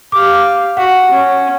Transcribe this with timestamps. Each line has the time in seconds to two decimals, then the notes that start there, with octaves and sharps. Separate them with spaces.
0.12 G4 F5 D6
0.77 F#4 F#5
1.11 C#4